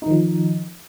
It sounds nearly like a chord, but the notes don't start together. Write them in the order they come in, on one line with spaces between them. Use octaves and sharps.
D#4 D#3 F3